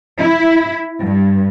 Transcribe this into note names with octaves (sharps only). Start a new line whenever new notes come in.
E4
G2